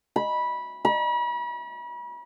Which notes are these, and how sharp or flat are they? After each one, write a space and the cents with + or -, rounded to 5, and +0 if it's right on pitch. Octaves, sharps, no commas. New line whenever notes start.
B5 -15
B5 -40